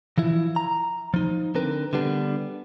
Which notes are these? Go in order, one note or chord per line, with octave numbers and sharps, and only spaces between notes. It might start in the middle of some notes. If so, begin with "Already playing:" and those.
E3 F3 E4
A#5
F3 D#4
D3 C4 A#4 B4
D3 G3 B3 D4